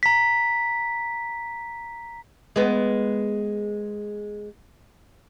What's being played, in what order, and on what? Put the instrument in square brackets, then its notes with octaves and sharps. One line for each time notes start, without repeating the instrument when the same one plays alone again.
[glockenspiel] A#5 B6
[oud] G#3 B3